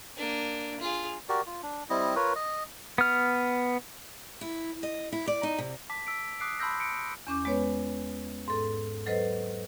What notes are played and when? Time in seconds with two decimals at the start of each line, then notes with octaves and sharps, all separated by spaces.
0.17 A#3 D4
0.80 F4 G#4
1.29 F#4 G4 A#4 D5
1.47 F4
1.63 D4
1.90 G3 C4 E4 D#5
2.16 F4 A#4 B4 C#5
2.36 D#5
2.98 B3 F6
4.41 E4
4.83 D#5
5.12 E4
5.27 D5
5.43 D#4
5.58 C3
5.90 A5 D6 B6
6.07 E6 B6 D7
6.40 D6 D#6 F#6 C7 D7
6.60 A5 B5 C6 E6 G6 A#6
6.80 C#7 D7
7.27 E2 C#4 D6 G6
7.45 G#3 B3 B4 C#5
8.48 G#2 A4
9.06 F#3 A4 B4 C5 D#5